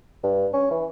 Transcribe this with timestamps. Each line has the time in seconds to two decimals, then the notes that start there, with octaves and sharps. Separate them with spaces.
0.23 G2
0.53 C#4
0.71 E3